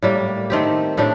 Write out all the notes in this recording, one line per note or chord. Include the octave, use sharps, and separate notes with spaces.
A2 G3 A#3
D#3 A3 C4 G4
A2 A3 D4 G4